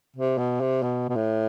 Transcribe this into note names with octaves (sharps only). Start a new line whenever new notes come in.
C3
B2
C3
B2
B2
A2